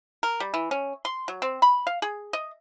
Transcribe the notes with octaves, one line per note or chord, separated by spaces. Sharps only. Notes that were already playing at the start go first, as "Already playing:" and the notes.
A#4
G3
E3
C#4
C6
F#3
C4
B5
F5
G#4
D#5